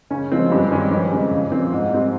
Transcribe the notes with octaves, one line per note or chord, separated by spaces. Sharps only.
C#3 C#4
F3 G#3 C4
G2 C4
D#3 G#3 C#4
F2 C#4
C#3 G#3 C4 C#4
A#2
F3 C4
G#2 D#4
G3 C4